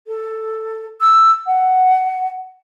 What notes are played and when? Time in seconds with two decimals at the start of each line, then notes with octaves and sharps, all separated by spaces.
0.07 A4
1.01 E6
1.46 F#5